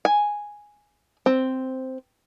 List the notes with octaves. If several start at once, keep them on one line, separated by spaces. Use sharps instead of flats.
G#5
C4